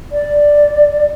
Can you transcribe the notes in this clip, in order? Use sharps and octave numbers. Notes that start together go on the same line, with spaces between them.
D5